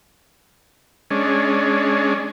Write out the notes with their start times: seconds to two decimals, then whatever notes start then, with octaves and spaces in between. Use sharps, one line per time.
1.11 G#3 C#4 D4